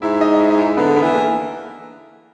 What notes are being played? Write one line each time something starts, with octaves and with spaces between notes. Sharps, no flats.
G#2 E4 E5
D#4 D#5
D#5
E4 E5
D#5
E4 E5
D3 B3 B4
B3 B4
E3
A#3 A#4